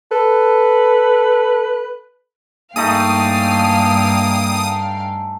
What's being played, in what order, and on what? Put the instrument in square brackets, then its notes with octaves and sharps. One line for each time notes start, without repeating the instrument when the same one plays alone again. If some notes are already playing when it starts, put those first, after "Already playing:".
[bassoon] A4 [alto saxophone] B4
[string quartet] G2 F5 G5 [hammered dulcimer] A3 D#4 G#4 [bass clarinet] A#3 [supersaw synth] D#6